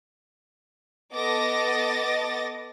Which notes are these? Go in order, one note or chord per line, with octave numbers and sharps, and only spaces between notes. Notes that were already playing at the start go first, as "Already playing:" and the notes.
B3 A4 D#5 D6 A6 A#6